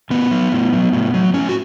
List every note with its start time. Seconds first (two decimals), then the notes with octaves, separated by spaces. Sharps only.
0.10 A2 B3
0.31 F#3
0.52 A2
0.73 F#3
0.93 A2
1.14 F#3
1.34 A2 C#4
1.49 F#4